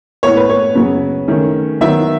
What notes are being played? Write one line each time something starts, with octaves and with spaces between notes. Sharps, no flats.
A2 E3 B3 C#5
B4
C#5
C#3 F#3 B3
D#3 A3 C#4
D#3 F#3 B3 E5